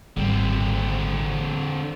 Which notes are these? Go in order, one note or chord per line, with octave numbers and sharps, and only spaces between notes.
G#1 D3 G3 C4